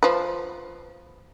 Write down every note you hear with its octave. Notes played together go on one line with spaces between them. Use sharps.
F3 B4